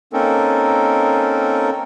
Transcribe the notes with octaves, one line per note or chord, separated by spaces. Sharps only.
A#3 C4 C#4 D#4 A4 A#4